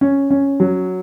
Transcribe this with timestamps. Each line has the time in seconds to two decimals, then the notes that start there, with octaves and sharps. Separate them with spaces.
0.01 C#4
0.30 C#4
0.60 F#3